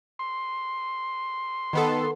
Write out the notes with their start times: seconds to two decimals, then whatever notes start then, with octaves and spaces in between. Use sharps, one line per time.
0.19 C6
1.73 D#3 B3 A4